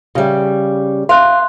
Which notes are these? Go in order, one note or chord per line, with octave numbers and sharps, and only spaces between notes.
C#3 G3
F5 C6 F#6